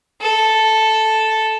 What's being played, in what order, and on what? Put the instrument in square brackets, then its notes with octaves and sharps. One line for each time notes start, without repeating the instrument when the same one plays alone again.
[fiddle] A4